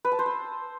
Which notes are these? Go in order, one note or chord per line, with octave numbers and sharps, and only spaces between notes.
B4
A5
C5
E6